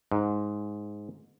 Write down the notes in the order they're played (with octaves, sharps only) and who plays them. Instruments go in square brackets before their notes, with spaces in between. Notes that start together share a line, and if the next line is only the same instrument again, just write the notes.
[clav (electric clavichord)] G#2